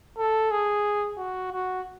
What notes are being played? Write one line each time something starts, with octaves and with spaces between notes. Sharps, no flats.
A4
G#4
F#4
F#4